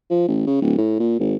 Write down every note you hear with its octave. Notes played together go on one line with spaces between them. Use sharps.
F3
A1
C#3
D1
A2
A#2
G#1